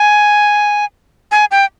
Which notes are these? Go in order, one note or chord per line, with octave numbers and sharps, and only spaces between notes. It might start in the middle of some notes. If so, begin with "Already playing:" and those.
Already playing: G#5
G#5
G5